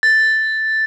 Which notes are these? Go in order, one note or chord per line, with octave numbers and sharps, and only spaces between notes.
A6